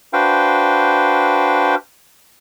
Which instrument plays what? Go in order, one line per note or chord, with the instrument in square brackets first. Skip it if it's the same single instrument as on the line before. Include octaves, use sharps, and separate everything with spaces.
[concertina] D4 F#4 B4 C5 F5 G5